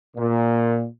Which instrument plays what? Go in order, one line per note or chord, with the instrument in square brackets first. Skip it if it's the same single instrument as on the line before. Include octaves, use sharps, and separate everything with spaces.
[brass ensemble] A#2